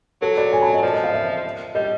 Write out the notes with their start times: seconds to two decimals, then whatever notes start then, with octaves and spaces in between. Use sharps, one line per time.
0.22 F#3 A4
0.37 D5
0.53 G#5
0.62 A5
0.73 D#5
0.83 F3 D5
0.93 D#5
1.04 F5
1.14 E5
1.75 G3 D#5